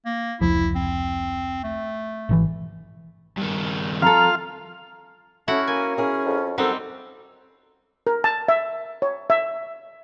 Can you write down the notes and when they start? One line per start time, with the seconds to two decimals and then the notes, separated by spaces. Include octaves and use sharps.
0.05 A#3
0.41 F1 C#2 F3 E4
0.75 C4
1.64 A3
2.29 G#1 C3 E3
3.38 G2 D#3
4.02 F2 F4 A4 F5 A#5
5.48 A3 C#4 E4 F#4 F#5
5.67 A#3 G#5
5.97 C#4 E4 G#4 A#4
6.26 F2
6.58 F#2 D#3 G3 C4 D#4 A4 F#5
8.07 A#4
8.24 A5
8.48 E5
9.02 C#5
9.30 E5